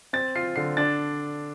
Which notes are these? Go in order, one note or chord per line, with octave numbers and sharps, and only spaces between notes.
C4 A6
F4 C7
D3 C7
D4 A6